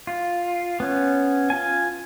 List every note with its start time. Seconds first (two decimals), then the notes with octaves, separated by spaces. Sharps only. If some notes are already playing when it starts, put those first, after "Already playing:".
0.07 F4
0.80 B3 C#4
1.50 F4 G#5